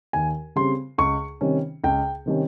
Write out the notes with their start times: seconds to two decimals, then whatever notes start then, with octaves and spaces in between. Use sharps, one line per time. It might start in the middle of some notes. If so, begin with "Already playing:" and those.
0.13 D#2 G#5
0.56 C#3 G3 C4 C6
0.98 C#2 C#6
1.41 C3 D#3 G3 C#4
1.84 C#2 G5
2.26 C3 D#3 G3 C#4